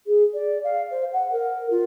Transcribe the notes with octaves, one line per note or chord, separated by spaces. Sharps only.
G#4
D5
F5
C5
F#5
A#4
F4